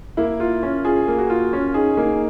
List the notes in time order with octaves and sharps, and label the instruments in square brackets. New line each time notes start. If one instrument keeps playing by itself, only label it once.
[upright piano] A#3 [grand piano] E4
[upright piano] F4
C#4
[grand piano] F4 [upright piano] G#4
[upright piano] A#3
[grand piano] F#4
[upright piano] F4
C#4
[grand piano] D#4 [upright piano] G#4
[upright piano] A#3 [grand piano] D#4